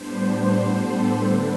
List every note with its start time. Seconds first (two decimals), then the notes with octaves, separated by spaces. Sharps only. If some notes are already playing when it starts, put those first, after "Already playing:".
Already playing: A2 G3 B3 D4 C5
0.55 A4
1.20 D3 A3 C4 B4